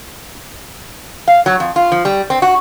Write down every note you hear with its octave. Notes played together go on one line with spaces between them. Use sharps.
F5
F#3
F2
F4
F3
G3
C4
F#4